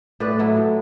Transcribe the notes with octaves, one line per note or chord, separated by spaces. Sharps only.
A2 B4 D5
F#3 A3 E4
A2